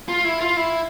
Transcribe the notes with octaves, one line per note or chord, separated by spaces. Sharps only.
F4
E4
F4
E4